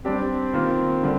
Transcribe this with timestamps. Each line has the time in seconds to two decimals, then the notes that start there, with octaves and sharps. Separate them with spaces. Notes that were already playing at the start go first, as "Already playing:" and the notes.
0.04 G3 C4 D4 G4
0.53 D#3 A#3 F4
1.03 D3 G3